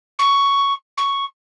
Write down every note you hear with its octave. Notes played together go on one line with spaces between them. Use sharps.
C#6
C#6